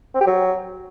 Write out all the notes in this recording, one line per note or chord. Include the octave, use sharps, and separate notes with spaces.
C4
G4
F#3